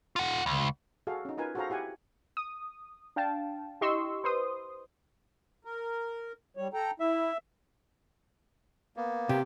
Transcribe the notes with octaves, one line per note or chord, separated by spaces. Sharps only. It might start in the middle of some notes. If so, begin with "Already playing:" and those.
F4 F#5
C#2
F#4 G#4 A4 F5
C#4 D#4
D#4 F4 A#4 B4 G#5
F#4 G#4 A4 C5 F5 A#5
E4 G4 F#5 G#5
D#6
D4 F5 G5 A5
E4 G4 D#5 C6 C#6 E6
B4 C5 C6 D#6
A#4
G3 C#5
A4 G5 A#5
E4 E5
A#3 B3
C3 G4